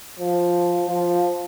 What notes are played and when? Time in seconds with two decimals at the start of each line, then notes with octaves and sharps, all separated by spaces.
0.20 F3
0.88 F3